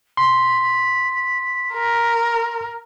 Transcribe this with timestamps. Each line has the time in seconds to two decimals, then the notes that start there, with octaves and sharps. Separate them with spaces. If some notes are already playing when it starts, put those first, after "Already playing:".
0.17 C6 B6
1.73 A#4